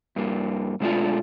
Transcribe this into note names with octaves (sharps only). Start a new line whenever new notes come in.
G2 A#3
B2 G#3 A3 D4 F4